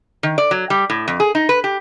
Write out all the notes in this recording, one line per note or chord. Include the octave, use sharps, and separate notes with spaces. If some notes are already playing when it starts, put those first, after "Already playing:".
D#3
D5
F#3
G3
A2
F2
G#4
D#4
B4
G4